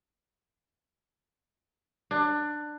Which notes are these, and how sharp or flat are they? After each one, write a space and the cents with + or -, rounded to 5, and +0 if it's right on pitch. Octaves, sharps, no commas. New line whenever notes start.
D4 +20